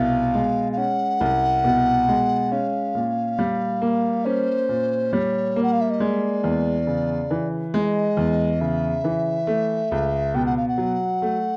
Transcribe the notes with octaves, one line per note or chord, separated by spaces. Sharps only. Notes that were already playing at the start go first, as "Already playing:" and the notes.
Already playing: C2 B2 F5
G#3
F5
C#4 F#5
C2
B2
G#3
C#4 F5
A#2
G3
A#3
C#4 C5
A#2
G3 C#5
A#3
F#5
F5
E5
D#5
G#3 D5
E2
C#3
E3
G#3 D#5
E2
C#3 E5
E3
A3
C#2
B2 G5
F#5
F5
F#5
F#3
A3